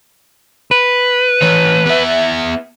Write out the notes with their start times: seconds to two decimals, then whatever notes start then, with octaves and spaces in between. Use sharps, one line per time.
0.71 B4
1.42 E3 C#5
1.86 B3 E5